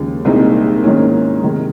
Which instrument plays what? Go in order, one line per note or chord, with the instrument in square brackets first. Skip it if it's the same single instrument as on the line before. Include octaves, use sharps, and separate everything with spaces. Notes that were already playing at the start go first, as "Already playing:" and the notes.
Already playing: [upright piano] D#2 C#3 F3 G#3
C2 A#2 G#3 C4 D#4
G#2 D#3 A#3 C#4
C3 D#3 G#3